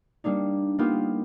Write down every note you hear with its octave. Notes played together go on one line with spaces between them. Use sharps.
G3 A#3 D4 D#4
A#3 B3 D#4 F4 G4 A#4